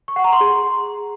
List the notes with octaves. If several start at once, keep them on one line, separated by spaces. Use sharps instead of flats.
C#6
F#5
A#5
C6
G#4